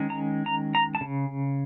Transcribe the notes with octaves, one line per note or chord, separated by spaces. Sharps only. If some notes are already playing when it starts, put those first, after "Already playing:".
Already playing: D#3 G#3 C#4
A#5
A#5
A#5
A5
C#3